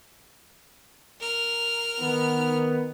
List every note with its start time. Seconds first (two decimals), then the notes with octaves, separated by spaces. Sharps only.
1.20 A#4 F6
1.99 D#3 B3